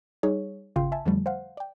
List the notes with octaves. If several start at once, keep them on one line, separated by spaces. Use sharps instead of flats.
G3 D#4 G#4 C#5
G#1 C#3 F4 F5 G5 C6
E5 G#5 A5
F2 D3 F3 G3 A3
C5 F5 F#5
D5 G5